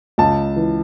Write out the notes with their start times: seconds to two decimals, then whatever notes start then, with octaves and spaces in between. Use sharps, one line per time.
0.18 C#2 A5
0.56 E3